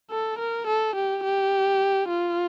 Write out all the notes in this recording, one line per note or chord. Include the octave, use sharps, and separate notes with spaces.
A4
A#4
A4
G4
G4
F4